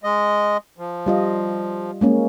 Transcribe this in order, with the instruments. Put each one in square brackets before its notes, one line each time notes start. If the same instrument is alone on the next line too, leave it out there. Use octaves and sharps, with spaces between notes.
[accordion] G#3 D#5
F3
[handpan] G3 F4 D#5
G#3 A#3 C#4